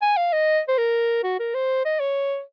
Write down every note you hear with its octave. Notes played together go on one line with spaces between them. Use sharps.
G#5
F5
D#5
C5
A#4
F#4
A#4
C5
D#5
C#5